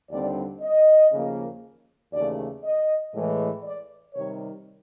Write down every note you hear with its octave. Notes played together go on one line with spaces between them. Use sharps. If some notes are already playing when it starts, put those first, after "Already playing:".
D#2 D3 G3 C4 D5
D#5
D#2 C#3 F3 A#3
D#2 C#3 E3 A3 D5
D#5
A2 E3 G#3
D5
C3 D#3 G3 C#5